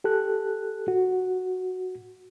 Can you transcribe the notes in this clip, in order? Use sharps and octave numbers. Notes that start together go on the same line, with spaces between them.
G4 A4 F#6
F#4